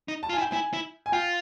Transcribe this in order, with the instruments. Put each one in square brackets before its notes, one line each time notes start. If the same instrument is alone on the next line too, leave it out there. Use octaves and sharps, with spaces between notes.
[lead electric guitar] D#4
[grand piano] A5
[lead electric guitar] F4
[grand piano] G#5
[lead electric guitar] E4
[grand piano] G5
[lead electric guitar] E4 [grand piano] G#5
[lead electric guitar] E4
[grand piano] G#5
[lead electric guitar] F4 [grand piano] G5